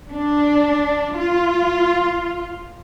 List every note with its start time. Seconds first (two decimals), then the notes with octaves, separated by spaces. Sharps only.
0.10 D4
1.15 F4